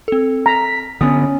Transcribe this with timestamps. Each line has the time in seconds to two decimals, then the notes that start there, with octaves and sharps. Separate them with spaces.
0.08 C4 A4
0.46 A#5 B6
1.01 D3 B3 C#4 D#6